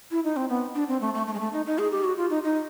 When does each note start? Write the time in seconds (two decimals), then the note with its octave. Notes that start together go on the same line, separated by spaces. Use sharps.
0.11 E4
0.24 D#4
0.37 C4
0.49 B3
0.75 D4
0.88 C4
1.01 A3
1.14 A3
1.27 A3
1.34 G#3
1.40 A3
1.53 D#4
1.66 D#4
1.79 G#4
1.91 G4
2.04 F#4
2.17 F4
2.30 D#4
2.44 D#4